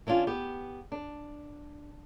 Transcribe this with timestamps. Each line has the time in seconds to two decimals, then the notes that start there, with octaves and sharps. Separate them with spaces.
0.07 E3 C#4 D4 F4
0.27 B3 G4
0.92 D4